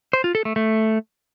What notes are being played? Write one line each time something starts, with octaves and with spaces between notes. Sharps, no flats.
C5
F4
A4
A3
A3